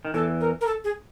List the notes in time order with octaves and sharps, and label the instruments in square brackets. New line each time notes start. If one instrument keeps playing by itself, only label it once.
[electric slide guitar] D#3
[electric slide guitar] E2 E3 [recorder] A4
[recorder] A#4
A#4
A4
G#4